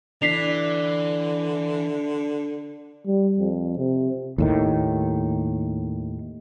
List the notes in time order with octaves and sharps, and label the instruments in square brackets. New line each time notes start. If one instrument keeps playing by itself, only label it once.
[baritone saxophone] D3 [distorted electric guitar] E3 [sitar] D4 [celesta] B6 C7 F7
[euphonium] G3
F2
C3
[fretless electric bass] D#2 A2 D#3